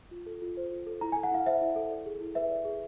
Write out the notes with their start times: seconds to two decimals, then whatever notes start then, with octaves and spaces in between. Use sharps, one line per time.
0.11 F4
0.26 A4
0.42 F4
0.57 C5
0.72 F4
0.87 A4
1.01 E4 A#5
1.12 G#5
1.16 A4
1.23 F#5
1.31 E4 F5
1.46 C5 E5
1.61 E4
1.76 A4
1.91 D5
2.06 G#4
2.21 E4
2.35 B4 E5
2.50 D5
2.65 G#4